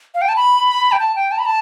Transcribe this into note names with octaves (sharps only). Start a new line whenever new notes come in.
F5
G5
A5
B5
G5
A5
G5
A5
B5
A5